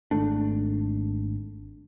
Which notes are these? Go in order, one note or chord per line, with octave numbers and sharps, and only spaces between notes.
G#1 A3 D4